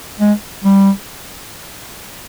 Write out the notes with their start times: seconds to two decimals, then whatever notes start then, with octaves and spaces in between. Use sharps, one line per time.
0.19 G#3
0.64 G3